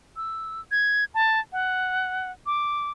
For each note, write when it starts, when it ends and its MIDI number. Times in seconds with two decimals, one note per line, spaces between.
0.16 0.61 88
0.71 1.05 92
1.14 1.40 81
1.52 2.31 78
2.46 2.91 86